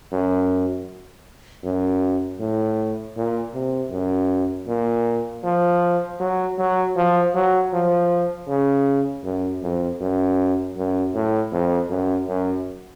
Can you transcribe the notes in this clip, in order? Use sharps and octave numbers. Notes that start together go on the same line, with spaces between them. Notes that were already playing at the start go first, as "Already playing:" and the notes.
F#2
F#2
A2
A#2
C3
F#2
A#2
F3
F#3
F#3
F3
F#3
F3
C#3
F#2
F2
F#2
F#2
A2
F2
F#2
F#2